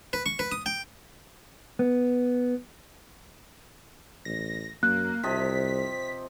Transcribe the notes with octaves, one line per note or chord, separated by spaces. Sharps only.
B4
C#6
B4
D#6
G5
B3
A1 A#6
F#2 A#3 F#6
C2 C3 F3 D#5 B6